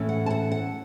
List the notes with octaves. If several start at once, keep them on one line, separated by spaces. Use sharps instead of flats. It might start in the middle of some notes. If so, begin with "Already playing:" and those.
Already playing: A2 E3 A3 C#4
F#5
A5
F#5
F#5